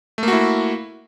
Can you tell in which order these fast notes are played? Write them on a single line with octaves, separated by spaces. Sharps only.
A3 A#3 F#4 E4